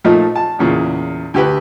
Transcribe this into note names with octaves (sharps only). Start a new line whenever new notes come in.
A#2 F3 A3 D#4
A5
E2 A#2 C#3
D2 G4 B4